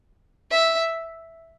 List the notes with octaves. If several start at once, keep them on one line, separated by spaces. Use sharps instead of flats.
E5